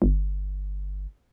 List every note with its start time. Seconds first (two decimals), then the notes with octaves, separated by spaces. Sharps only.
0.02 G1